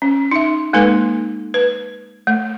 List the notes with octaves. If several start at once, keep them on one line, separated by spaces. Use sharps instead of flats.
C#4
D#4 E5
G#3 A#3 D#4 A4 B4
B4
A3